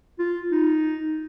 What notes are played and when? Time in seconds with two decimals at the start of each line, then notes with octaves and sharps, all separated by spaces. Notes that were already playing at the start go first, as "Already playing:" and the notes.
0.19 F4
0.51 D#4